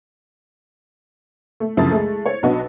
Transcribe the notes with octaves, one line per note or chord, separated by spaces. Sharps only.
A3
C2 F#2 C#3 F3 D#6 A6
G#3 A3
C5 C#5
B1 B2 B3 D4 F#4 D#5